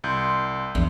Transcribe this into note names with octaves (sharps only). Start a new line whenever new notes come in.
C2 C6 G6
A#1 E2